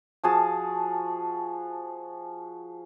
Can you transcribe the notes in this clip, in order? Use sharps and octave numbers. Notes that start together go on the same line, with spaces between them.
F3 F#4 G#4 A5